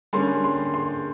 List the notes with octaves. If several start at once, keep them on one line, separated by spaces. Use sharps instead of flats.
D3 G3 A#3 C#4 C6
C6
C6